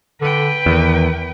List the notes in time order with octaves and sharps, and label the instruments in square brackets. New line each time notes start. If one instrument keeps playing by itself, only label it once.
[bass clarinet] D3 [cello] B4 G5
[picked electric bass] E2 [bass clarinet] D#3